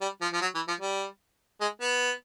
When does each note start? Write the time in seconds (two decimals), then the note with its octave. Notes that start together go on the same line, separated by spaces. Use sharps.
0.01 G3
0.21 F3
0.33 F3
0.41 F#3
0.55 E3
0.68 F3
0.81 G3
1.61 G#3
1.81 B3